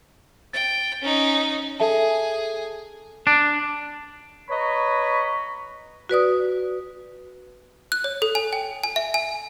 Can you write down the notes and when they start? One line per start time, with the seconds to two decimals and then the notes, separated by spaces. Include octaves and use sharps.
0.53 G5 A6
1.02 C#4 D#4
1.80 G#4 A4 E5 A5
3.27 D4
4.50 B4 C#5 D#5 A#5 B5 C#6
6.09 F#4 B4 D5 D#6
7.92 F#6
8.04 C#5
8.22 A4
8.35 G#5
8.53 G5
8.84 G#5
8.96 E5
9.14 G#5